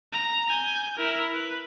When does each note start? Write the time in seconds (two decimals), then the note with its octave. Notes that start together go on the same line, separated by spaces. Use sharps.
0.13 A#5
0.50 G#5 G6
0.98 E4 A#4
1.33 B4